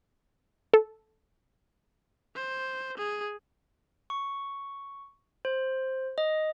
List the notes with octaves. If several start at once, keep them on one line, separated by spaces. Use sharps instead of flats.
A4
C5
G#4
C#6
C5
D#5